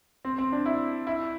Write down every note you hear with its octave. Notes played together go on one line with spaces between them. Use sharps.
C4
C4
D4
E4
E4